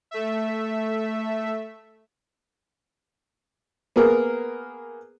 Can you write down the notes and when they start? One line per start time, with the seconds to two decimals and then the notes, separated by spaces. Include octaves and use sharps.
0.11 A3 E5
3.96 A#3 B3 G#4 A#4